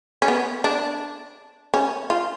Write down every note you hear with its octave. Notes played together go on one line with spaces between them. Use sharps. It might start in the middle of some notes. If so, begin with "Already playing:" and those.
C#4
B3
D4
C#4
F4